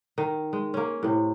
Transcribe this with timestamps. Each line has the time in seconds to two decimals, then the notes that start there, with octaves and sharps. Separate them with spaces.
0.18 D#3
0.53 G#3
0.74 A#3 C#4
1.03 A2 C3